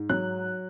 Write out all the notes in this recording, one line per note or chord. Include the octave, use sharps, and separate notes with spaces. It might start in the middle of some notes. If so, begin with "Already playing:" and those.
Already playing: G#2
F#3 F#6